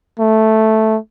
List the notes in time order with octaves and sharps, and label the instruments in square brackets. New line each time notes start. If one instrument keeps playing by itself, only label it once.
[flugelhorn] A3